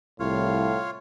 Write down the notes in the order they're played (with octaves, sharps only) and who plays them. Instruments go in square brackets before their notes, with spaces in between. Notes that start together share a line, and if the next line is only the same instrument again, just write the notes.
[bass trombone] C2 [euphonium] A2 [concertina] F4 C#5 F5